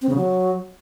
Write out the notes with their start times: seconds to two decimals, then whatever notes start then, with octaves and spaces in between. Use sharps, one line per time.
0.02 C4
0.09 C#3
0.17 F#3